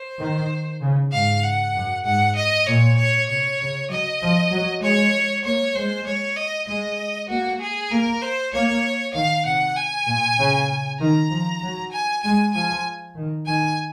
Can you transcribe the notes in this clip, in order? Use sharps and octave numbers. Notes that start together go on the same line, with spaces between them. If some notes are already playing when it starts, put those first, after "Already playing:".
Already playing: C5
D#3
C#3
G#2 F5
F#5
F#2
G#2 F#5
D#5
A#2 C#5
C#5
C3 C#5
C#3
F#3 D#5
F3
F#3
G#3 C#5
A#3 C#5
G#3 C5
C#5
D#5
G#3 D#5
A#3 F#4
G#4
A#3 A#4
C5
A#3 C#5
D#3 F5
C3 F#5
G#5
A#2
C#3
D#3 A#5
F3
F#3
G#5
G#3 G#5
F3 G#5
D#3
D#3 G#5